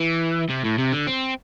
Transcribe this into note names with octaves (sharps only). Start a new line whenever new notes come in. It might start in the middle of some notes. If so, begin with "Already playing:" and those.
Already playing: E3
C3
A2
C3
D3
C4